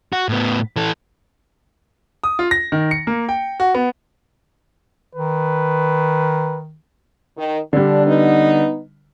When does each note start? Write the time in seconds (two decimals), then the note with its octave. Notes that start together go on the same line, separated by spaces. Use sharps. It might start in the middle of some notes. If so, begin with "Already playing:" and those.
0.13 F#4
0.29 A2 B3
0.76 E3 A4
2.24 D#6
2.39 F4
2.51 A#6
2.72 D#3
2.91 C#7
3.07 A#3
3.29 G5
3.60 F#4
3.74 B3
5.15 D#3 B4
7.38 D#3
7.73 D3 G3 D4
8.06 B3 D#4